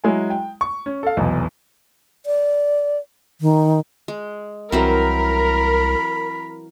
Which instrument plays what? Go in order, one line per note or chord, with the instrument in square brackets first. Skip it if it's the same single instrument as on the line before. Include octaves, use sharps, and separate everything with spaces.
[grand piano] F#3 G#3 E4 G#5
G5
C#6
C#4
A4 F5
F1 B1 E2
[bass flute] D5
D#3
[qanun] G#3
[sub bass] C2 [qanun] E3 F#3 C4 [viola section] A#4 [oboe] B5